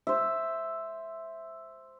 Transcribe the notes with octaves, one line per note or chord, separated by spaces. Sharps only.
C5 E5